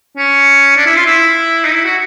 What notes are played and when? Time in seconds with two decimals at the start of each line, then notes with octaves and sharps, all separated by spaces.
0.17 C#4
0.76 D4
0.86 E4
0.96 F4
1.06 E4
1.65 D#4
1.75 E4
1.85 F#4